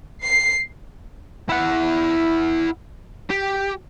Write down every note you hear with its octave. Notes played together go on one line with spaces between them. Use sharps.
C7
E4 F#5
G4